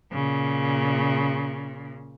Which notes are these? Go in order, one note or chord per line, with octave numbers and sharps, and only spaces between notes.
A#2 C#3